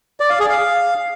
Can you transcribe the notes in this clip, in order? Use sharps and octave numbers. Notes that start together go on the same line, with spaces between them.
D5
F5
G#4
F5